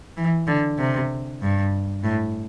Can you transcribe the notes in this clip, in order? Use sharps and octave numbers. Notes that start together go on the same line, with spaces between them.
E3
D3
C3
G2
A2